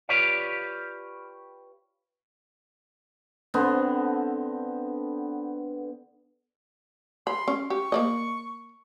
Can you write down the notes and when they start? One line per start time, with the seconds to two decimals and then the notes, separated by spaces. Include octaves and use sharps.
0.09 F4 G4 B4 C#5 D5 F5
3.54 D3 B3 C4
7.27 B5 C6
7.48 C#4
7.70 G4 C#6
7.92 A#3 D5 D#5